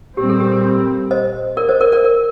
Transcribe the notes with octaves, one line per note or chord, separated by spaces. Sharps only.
A#2 G3 C4 G4
A4
G4
C5 D#5
A#4 D5
C5 D#5
A#4 D5
A#4 D5
A#4